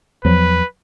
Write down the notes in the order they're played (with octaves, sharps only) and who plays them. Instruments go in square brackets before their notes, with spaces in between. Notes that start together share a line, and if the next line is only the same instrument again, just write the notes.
[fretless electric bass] E2 F3 F#3 [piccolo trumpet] B4